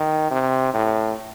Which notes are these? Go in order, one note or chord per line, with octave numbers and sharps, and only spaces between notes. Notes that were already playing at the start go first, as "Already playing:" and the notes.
Already playing: D#3
C3
A2